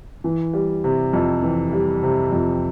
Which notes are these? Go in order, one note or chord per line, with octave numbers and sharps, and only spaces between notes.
E3
G3
C3
F2
E3
G3
C3
F2